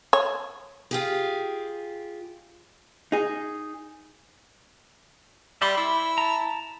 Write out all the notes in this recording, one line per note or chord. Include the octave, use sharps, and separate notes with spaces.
C#5
F4 G4 G#4
D#4 G#4
G3 E5 B5 C6
E4
A5 A#5